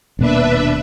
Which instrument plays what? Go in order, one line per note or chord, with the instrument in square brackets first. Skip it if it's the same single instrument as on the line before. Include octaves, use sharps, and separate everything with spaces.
[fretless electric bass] D#1 B2 A#3 [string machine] D4 B4 E5